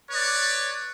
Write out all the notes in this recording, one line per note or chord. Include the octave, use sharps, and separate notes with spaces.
B4 C#5 D5